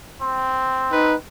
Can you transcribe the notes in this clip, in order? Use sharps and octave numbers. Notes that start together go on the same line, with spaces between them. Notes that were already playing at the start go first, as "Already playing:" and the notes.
C4
D#4 B4